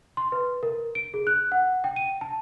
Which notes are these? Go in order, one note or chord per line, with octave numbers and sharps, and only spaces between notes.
C6
B4
A#4
D7
G#4
F#6
F#5
G5
D#7
A5